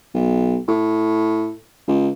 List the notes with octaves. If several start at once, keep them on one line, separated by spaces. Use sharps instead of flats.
B1
A2
C#2